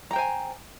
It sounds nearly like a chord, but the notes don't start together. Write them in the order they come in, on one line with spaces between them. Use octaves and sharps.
A#5 G5 C5 G#5